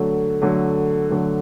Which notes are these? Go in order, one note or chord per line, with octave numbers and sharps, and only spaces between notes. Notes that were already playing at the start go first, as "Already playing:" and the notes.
Already playing: D3 F#3 A3
D3 F#3 A3
D3 F#3 A3